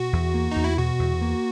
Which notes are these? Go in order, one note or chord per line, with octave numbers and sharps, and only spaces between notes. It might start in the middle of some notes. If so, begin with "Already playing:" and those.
Already playing: B2 F#4
E2
A#3
E2 D#4
E4
B2 F#4
E2
A#3